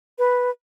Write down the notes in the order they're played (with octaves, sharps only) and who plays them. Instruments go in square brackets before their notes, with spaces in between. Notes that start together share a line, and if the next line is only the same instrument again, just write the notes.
[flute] B4